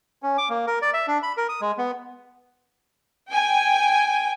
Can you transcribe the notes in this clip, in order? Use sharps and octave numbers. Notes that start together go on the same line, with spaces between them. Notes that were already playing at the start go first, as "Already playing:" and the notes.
C#4
D6
A#3
A#4
D5
E5
D4
B5
A#4
D#6
G#3
B3
G5 G#5